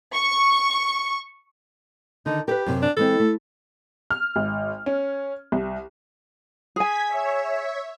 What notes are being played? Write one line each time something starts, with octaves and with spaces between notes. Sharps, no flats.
C#6
D3 D#3 D#4
G4 A#4 B4
F#2 C3
D4
E3 G#3 C4 A4
A3
F6
G#1
C#4
C2
G#4 G#5 G#6 B6
C#5 E5